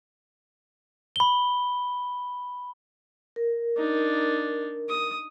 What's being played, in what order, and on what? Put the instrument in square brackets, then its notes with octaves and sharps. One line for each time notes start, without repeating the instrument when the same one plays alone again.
[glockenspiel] B5 G7
[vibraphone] A#4
[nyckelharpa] D4 D#4
D#6